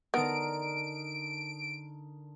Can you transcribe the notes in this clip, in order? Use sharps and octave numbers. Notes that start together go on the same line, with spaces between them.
D3 B3 D#4 A#4 D7